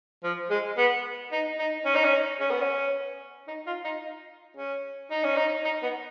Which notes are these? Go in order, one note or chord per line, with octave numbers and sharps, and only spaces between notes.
F3
G#3
B3
D#4
D#4
C#4
D#4
C#4
C#4
B3
C#4
D#4
F4
D#4
C#4
D#4
C#4
D#4
D#4
B3